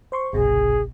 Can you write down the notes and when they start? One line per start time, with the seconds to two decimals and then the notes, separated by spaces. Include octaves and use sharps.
0.12 C5 C6 C#6
0.33 G1 C2 B2 G#4